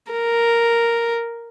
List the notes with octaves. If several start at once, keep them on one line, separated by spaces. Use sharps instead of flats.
A#4